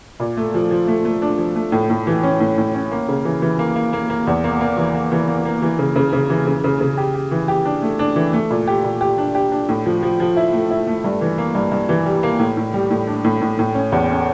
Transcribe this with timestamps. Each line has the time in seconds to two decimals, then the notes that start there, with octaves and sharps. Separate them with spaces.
0.20 A#2
0.37 A3
0.54 F3
0.71 F3
0.88 A3
1.05 A3
1.22 D4
1.38 F3
1.56 A3
1.72 A2
1.90 A2
2.07 E3
2.23 C#4
2.40 A2
2.58 A2
2.74 C#4
2.91 A#3
3.09 C#3
3.25 E3
3.42 E3
3.59 A#3
3.76 A#3
3.93 A#3
4.10 A#3
4.27 E2
4.44 A#3
4.61 A#3
4.78 E3
4.94 A#3
5.12 E3
5.28 A#3
5.45 A#3
5.62 E3
5.79 C#3
5.96 C#3
6.13 C#3
6.30 E3
6.47 C#3
6.64 C#3
6.81 C#3
6.97 G4
7.14 G4
7.31 E3
7.48 G4
7.65 D4
7.82 A3
7.99 D4
8.16 E3
8.33 A3
8.50 A#2
8.67 G4
8.84 A#2
9.01 G4
9.18 D4
9.35 G4
9.52 D4
9.69 A2
9.86 F3
10.03 F3
10.20 F3
10.37 E4
10.53 A3
10.71 E4
10.87 A3
11.04 G2
11.21 E3
11.38 A#3
11.55 G2
11.72 G2
11.89 E3
12.06 G3
12.23 A#3
12.40 A2
12.57 A2
12.74 G3
12.90 A2
13.07 D4
13.24 A2
13.41 A2
13.59 A2
13.75 C#4
13.92 E2
14.09 C#4